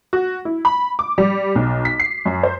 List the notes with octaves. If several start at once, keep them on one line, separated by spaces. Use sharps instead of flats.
F#4
E4
B5
D6
G3
B1
B6
C7
F#2
C5